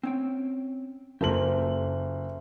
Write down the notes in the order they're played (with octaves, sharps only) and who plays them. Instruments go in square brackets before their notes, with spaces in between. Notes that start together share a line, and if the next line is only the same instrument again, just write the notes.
[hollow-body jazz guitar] C4 C#4 G5
[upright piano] F#1 A4 F#7 [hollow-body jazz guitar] A#3 F4 G4